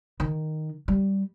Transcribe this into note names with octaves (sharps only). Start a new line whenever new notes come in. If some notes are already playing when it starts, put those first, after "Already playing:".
D#3
G3